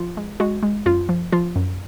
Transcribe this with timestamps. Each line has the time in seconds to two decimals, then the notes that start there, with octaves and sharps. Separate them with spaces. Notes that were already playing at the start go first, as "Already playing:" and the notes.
Already playing: F3 F4
0.17 G#3
0.40 G#3 F#4
0.63 G#3
0.86 F#2 F4
1.09 F3
1.32 F3 F4
1.56 F#2